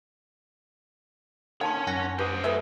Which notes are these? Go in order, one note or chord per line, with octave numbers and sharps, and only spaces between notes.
D#3 C#5 F5 G#5 A5 C6
F#2 F#5 A#6
G4 B4 C5 D#5
A3 G#4 B4 E5